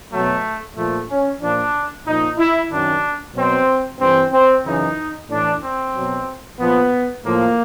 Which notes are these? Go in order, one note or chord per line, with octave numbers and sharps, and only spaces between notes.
B2 F#3 A3
A#2 F3 A3
C#4
A#2 F3 D4
A#2 F3 D#4
E4
F#2 D#3 F#3 D4
B2 F#3 C4
G2 E3 C4
C4
F#2 C#3 E3 D#4
A2 E3 D4
C4
B2 F#3
A#2 F3 B3
A2 F3 A#3